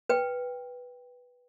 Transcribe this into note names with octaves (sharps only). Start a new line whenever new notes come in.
B4 G5